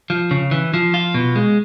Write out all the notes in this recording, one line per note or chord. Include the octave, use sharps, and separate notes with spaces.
F3
C#3
E3
F3
F4
B2
G#3